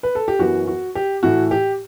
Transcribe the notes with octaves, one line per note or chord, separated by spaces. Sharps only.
B4
A4
G4
F#2 E3 B3 F#4
F#4
G4
A2 E3 A3 F#4
G4